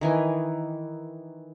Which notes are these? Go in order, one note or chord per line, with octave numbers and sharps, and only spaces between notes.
D#3 E3 G#5